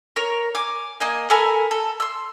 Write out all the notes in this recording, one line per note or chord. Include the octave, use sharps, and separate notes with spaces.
A#4 C#5
G#5 D6
A#3 D#5 G#5
A4 A#4 G#5 B5
A4
C6 E6